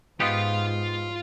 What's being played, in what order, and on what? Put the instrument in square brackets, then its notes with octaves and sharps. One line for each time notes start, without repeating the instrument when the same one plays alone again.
[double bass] G#2 [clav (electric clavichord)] B3 D#4 G4 [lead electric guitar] F4 F5